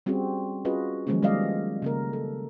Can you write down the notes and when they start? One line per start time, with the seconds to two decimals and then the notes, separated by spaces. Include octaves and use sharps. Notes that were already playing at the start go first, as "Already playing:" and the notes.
0.06 G3 C4 C#4 F#4 G#4
0.65 C#4 F4 F#4 G#4 B4 D#5
1.07 D#3 F3 F#3 G#3 A#3 C#4
1.22 G3 G#3 B3 D5 D#5 F5
1.82 C#3 A#3 A#4
2.13 A4